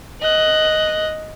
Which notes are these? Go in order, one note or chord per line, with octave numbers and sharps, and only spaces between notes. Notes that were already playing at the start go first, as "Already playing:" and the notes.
D#5 F#6